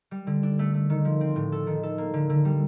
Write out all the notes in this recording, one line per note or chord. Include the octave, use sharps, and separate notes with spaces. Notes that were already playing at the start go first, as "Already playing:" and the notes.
G3
D3
D4
A3
A3
D#3
F3
C4
A2
A4
D#3
A4
A#3
D3
D3
G3